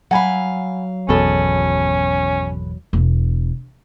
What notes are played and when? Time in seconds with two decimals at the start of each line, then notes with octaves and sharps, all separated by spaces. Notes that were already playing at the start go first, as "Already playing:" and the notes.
0.11 F#3 F5 F#5 G#5 B5
1.09 G#1 E2 B2 C#4 A4 B4
2.93 E1